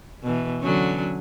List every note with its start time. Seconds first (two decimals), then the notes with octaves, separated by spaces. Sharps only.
0.23 B2 E3
0.61 D3 F#3 C#4